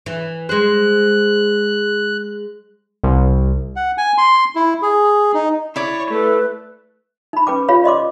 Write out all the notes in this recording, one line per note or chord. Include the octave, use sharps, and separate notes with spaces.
E3
G#3 C5 F#6
C2
F#5
G#5
C6
E4
G#4
D#4
E4 C#5 D5
A3 A4 B4
D#4 B5
C#4 B4 G5 D6
F4 G4 C#5 F5 B5
D5 D#5 C6 D6